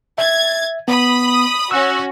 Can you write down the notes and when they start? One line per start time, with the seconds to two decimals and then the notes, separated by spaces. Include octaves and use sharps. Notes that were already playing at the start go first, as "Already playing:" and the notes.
0.18 E5 G#6 A6
0.88 B3 B5 D#6
1.71 C#4 F#4 E6 F#6